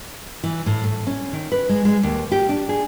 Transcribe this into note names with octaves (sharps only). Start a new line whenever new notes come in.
E3
A2
A3
C#4
D#3
B4
G#3
G#3
D#2
G4
D4
G#4